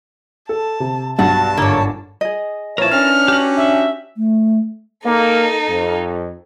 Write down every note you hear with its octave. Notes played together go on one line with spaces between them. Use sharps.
A4 A5
C3
B1 G2 F#4 A5 A6 C7
G1 G#2 A#3 D4 C#5
G#4 D#5
A#2 F3 E4 A#4 B4 C#5 A5
C#4 D4 F6
F#4 G4
E5
A3
A#3 D#4 A4
F2